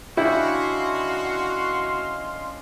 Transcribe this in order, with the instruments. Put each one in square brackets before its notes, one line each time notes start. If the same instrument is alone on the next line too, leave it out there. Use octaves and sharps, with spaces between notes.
[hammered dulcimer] C#3 D4 G5 [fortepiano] E4 [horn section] F#4 [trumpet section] D#5 F5 C6